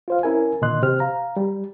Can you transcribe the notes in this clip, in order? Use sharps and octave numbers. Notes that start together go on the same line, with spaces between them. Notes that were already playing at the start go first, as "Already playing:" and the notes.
F4 C5 F5
C#4 E4 A#4 G#5
A#2 D3 D#3 D#5 C6 F#6
C3 G4 C5 F6
F5 A#5
G3